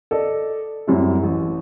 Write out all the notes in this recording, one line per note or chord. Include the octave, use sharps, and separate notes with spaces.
A4 D5 D#5
F#2 A2 G3 A3 C4 E4
A1